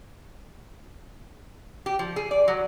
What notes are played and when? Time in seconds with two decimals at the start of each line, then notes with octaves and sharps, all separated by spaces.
1.86 G4
1.99 F3
2.16 G#4
2.31 D5
2.48 F#3